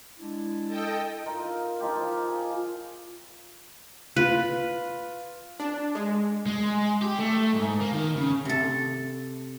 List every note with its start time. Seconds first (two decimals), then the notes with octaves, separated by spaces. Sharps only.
0.19 G#3 D4 E4
0.67 A4 D#5 G5
1.26 D#4 F4 A#4
1.80 F3 D#4 F4 G4
2.27 G#4
4.16 F4 B4
5.60 D4
5.95 G#3
6.46 G#3
7.02 G4
7.19 A3
7.54 G#2
7.81 A#3
7.94 D#3
8.17 C#3
8.45 C3 A4